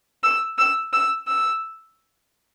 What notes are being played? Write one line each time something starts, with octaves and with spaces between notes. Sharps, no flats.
E6
E6
E6
E6